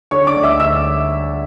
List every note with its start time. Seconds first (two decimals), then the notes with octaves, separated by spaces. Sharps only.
0.11 D3 C#5 C#6
0.27 D5 D6
0.35 D2
0.43 E5 E6
0.60 D2 E5 E6